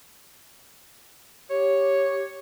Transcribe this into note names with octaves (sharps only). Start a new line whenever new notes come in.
G4 C#5